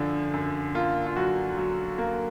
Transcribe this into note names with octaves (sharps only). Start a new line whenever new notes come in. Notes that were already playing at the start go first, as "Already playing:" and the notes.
Already playing: F#2 D3 F3
F#2
A#3 F4
F4
F#3 F#4
F#3
A#3